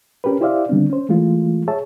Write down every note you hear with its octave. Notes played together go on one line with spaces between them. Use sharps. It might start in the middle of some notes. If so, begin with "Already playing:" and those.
C#4 G4 A#4 B4
E4 G4 C5 D5 E5 F5
D3 D#3 G3 B3 C4 D4
C#4 C5
E3 G#3 A3 F4
G#4 C#5 E5 A5